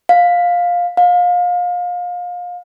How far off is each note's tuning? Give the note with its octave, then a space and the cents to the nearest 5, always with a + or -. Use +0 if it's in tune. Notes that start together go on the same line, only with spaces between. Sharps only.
F5 +10
F5 +30